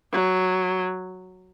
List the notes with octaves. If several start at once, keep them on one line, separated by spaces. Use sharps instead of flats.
F#3